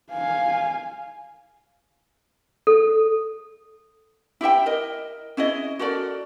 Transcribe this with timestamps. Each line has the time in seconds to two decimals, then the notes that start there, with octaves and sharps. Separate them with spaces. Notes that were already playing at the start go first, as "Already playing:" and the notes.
0.11 F5 G#5
2.67 A4
4.41 E4 G4 E5 G5
4.66 A#4 D#5
5.37 C#4 E4 G#4 D#5
5.79 F#4 A4 A#4 D5